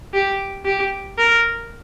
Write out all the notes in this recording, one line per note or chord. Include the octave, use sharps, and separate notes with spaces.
G4
G4
A#4